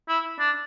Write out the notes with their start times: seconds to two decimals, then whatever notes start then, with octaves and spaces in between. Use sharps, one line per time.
0.08 E4
0.40 D4